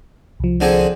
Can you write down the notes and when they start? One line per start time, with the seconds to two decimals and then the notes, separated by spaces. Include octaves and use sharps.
0.40 C2 F3
0.61 D3 C4 G#4